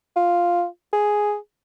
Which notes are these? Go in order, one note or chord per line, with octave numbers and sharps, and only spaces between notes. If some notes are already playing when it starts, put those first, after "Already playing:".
F4
G#4